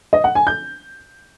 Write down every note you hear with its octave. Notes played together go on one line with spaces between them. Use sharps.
D#5
F#5
G#5
G6